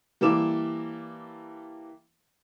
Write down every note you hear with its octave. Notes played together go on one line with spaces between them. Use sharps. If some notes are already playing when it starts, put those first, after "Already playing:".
E3 G3 A#3 A4 D6 E7